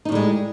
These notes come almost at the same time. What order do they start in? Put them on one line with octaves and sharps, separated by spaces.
D#4 A2 G3 G#3